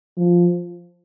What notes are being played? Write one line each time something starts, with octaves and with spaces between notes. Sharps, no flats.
F3